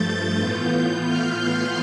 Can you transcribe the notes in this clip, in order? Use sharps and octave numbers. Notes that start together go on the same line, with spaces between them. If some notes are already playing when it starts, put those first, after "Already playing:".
Already playing: G2 F3 A3 G6 A6
A2 E3 B3 F4
G6
F6
C6